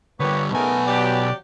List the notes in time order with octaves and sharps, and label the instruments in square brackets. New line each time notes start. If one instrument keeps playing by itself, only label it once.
[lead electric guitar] D3 G3 [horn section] A#3 B3 G4 [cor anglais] C#5
[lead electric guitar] B1 G#5 [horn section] C#3 D#4 A#4 [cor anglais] A3 [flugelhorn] B3
[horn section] F#3 G4 [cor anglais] D5